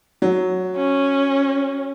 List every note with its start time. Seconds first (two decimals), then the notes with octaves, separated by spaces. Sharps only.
0.22 F#3
0.77 C#4